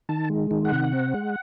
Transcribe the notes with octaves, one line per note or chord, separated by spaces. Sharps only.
D#3 A5
G#3
D#3
F#5
C3
C4
G#3